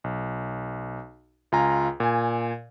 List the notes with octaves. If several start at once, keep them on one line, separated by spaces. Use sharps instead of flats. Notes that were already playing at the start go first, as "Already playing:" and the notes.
B1
C#2 F4 G#5 A#5
A#2 G#5